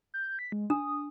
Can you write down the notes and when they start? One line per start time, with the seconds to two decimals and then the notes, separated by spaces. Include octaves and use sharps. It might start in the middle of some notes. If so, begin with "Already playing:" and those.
0.14 G6
0.39 B6
0.52 G#3
0.70 D4 D#6